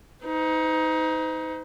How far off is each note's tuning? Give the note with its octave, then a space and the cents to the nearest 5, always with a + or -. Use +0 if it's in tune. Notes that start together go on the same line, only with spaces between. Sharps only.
D#4 +25 C5 -45